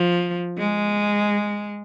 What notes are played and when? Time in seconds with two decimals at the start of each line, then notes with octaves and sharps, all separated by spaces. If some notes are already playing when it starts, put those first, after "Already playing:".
Already playing: F3
0.58 G#3